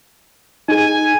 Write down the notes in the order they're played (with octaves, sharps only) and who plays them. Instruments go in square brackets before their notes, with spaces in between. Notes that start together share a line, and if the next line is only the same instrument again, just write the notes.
[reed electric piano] D#4 G#4 [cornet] G#5